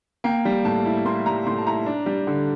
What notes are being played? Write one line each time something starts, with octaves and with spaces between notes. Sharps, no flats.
A#3 G5
G3
A2 A5
E4
A#3 C6
G3 A#5
A2 C6
A5
E4 A#5
D4
G3
D3